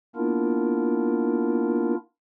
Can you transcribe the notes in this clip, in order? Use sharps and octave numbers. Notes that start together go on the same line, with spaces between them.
A#3 B3 D4 E4 F4 A#4